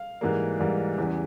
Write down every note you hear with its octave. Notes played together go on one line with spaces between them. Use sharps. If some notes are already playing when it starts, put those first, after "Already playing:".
Already playing: F5
G#2 E3 G3 A#3
G#2 E3 G3 A#3
E2 C#3 E3 G3